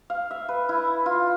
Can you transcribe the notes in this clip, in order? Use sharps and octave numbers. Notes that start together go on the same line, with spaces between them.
F5
E5
B4
E4
F4